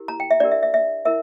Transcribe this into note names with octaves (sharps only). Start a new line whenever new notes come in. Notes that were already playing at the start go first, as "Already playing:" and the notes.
Already playing: E4 G4 A#4
A#5
G5
E5
D4 G4 A#4 D5
E5
E5
E5
E4 A#4 E5